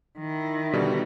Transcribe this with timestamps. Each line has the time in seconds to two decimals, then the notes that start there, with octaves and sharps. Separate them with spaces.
0.19 D#3 E4
0.73 B2 D3 G3